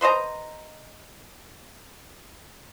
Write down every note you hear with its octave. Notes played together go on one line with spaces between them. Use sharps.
B4 C5 D#5 A#5